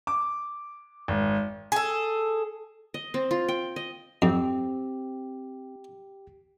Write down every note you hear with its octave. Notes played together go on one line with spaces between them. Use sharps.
D6
G#1
G#4 A4
D#5
C4
F4
G5
D#5
F2 C4 G4